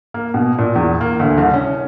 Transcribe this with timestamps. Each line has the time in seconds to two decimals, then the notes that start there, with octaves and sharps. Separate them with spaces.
0.14 A#3
0.34 B2
0.58 A#2
0.75 E2
1.01 A#3
1.19 D2
1.38 C2
1.54 C#4